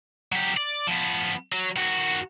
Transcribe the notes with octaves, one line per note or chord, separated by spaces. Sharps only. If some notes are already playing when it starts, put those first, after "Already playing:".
F#3 G4
D5
F3 B3
F#3
D#3 F#4